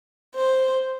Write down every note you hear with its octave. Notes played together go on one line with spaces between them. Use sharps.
C5